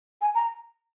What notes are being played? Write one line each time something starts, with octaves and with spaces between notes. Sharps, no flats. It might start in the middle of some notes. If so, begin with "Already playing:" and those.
G#5
A#5